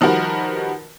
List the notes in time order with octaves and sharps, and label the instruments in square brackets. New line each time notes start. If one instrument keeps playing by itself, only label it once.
[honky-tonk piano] D#3 F3 G3 F#4 A#4 B4